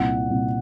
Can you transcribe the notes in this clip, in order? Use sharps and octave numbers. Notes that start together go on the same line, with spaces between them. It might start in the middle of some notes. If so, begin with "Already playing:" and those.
Already playing: C2 A#2 F#5
C2 A#2